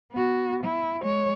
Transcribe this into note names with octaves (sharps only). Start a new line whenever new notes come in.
B3 F#4
E4
G#3 C#5